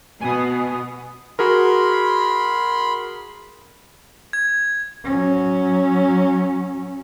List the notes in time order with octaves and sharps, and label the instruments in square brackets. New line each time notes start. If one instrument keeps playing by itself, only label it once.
[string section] B2 B3 [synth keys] G#5 D#6
[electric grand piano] F#4 G#4 A#4 [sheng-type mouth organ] B5 C6
[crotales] G#6
[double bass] F#3 C#4